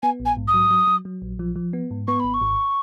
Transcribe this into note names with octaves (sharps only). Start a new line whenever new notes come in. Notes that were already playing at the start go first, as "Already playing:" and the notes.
B3 G#5
A#1
G#5
G#2
D#6
F#3
F#3
F#3
F#3
A#1
F3
F3
B3
G#2
B3 C#6
G#1 B5
C#6
G#1